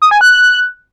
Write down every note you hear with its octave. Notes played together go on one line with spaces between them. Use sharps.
D#6
G#5
F#6